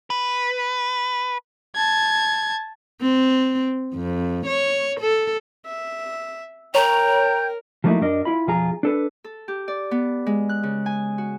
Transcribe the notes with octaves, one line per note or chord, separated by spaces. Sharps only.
B4
A5 G#6
C4
F2
C#5
A4
E5
A#4 C#5 G5 A#5 G6
F3 F#3 A3 A#3 D#4 E4
F#2 D4 A#4 D#5
E4 F4 B5
B1 F2 F3 F4 G#4 A#5
D4 A4 B4
A4
G4
D5
B3
G#3
F#6
C#3
G#5
F#4